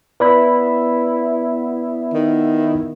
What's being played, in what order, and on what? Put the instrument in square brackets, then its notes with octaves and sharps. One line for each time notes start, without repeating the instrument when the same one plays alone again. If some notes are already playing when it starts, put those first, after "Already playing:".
[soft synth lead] B3 [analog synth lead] E4 [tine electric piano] B4 D5 B5
[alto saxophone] D#3